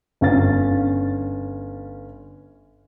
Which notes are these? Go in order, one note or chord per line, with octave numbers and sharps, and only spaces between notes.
G1 C#4 F5 A6